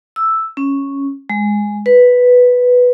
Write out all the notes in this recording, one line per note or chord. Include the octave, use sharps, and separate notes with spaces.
E6
C#4
G#3
B4